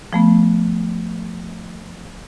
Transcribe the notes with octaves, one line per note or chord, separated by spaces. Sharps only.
F3 A3 B3